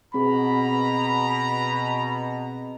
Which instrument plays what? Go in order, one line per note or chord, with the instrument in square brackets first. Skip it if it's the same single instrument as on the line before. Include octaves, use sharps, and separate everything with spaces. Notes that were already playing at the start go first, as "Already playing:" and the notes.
[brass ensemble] B2 [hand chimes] C4 G#4 [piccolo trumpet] A#5 [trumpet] B5